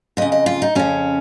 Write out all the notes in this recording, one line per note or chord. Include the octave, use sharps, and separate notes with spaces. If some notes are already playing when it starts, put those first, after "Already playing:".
F2 C#3 D#5
D#5
F4
D#4
F2 C#3 C#4